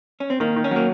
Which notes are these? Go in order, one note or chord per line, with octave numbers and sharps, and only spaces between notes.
C#4
C4
D#3 A#3
D#3
C#4
F#3 A#3